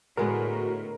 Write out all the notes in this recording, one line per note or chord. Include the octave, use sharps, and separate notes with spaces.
A2 D3 G#3 B3 F#4 A#4